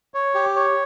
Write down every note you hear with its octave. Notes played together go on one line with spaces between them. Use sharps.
C#5
G4
C#5